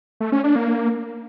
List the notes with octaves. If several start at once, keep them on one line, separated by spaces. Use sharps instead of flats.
A3
C#4
D4
A#3